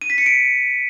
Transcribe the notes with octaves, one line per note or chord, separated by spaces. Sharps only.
D#7
B6
C#7
D7